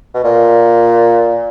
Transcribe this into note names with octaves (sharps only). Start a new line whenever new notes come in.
B2
A#2